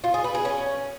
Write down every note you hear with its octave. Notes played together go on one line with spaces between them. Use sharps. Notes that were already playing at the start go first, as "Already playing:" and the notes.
F4
G#4
B4
G#4
C#4